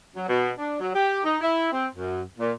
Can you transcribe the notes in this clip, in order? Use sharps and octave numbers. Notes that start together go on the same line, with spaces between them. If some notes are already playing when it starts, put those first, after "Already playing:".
F#3
B2
D4
F#3
G4
D#4
E4
C4
F#2
A#2